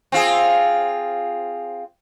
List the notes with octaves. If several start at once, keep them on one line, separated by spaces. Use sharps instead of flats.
C4 F4 G#4